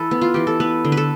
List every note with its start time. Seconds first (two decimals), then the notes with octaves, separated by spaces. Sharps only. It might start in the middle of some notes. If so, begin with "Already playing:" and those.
Already playing: E3 A4 B4
0.11 B3
0.21 F4
0.34 E3 G4
0.47 A4
0.60 B3 B4
0.85 D3
0.92 B4
0.97 A4